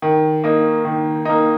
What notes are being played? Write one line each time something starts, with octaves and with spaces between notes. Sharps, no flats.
D#3
A#3 D#4
D#3
A#3 D#4